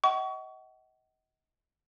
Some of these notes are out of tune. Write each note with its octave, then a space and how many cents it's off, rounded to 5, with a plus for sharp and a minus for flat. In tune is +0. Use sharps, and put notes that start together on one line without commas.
D#5 +30 F#5 +35 C#6 +25